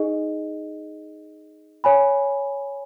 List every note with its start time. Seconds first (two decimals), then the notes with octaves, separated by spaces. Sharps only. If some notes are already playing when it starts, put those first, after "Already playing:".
Already playing: D#4 G#4 D#5
1.84 C#5 G#5 B5